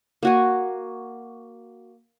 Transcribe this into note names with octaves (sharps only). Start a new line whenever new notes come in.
A#3 F#4 G#5